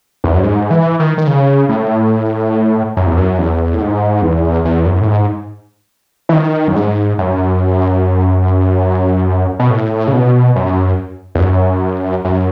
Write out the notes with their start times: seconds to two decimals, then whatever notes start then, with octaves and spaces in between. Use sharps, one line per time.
0.24 E2
0.34 F#2
0.43 G#2
0.71 E3
0.99 D#3
1.17 D#3
1.27 C#3
1.69 A2
2.97 F#2
3.06 E2
3.17 F#2
3.38 E2
3.74 A2
3.81 G#2
4.22 E2
4.65 E2
4.86 F#2
5.01 A2
5.07 G#2
6.29 E3
6.33 D#3
6.68 F#2
6.76 G#2
7.18 F#2
9.59 B2
9.70 A2
10.08 C#3
10.13 B2
10.56 F#2
11.35 E2
11.39 F#2
12.25 F#2